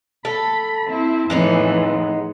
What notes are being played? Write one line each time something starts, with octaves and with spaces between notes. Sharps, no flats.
A4 B5
C4 E4
F2 A2 E3 G#3 B3 D#4